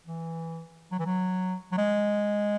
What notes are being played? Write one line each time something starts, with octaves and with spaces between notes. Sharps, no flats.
E3
F#3
E3
F#3
F#3
G#3